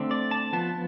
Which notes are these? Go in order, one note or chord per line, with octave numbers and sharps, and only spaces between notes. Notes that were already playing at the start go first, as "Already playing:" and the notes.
Already playing: D3 A3 C4
D5
A5
F3 B3 A5